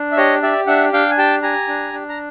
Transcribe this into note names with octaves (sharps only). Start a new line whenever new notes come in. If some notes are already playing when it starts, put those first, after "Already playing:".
Already playing: D4
E5
G4 C#5 D#5
G4 D5 E5
D4 E5 F#5
D4 F5 G5
G#5
G4 G5 A5
G4 G#5 A#5
D4
D4
A#5